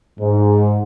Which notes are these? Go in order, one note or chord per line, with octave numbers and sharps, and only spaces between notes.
G#2